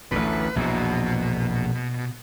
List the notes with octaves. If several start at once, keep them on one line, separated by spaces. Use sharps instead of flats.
A1 D2 A2 B4
A#1 E2 B2 F#4